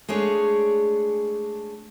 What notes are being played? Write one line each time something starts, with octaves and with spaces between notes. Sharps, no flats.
G#3 A3 D4 G#4 C#5